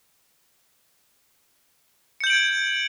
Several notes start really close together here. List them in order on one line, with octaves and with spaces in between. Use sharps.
C#7 G6 F#7 D7 G#6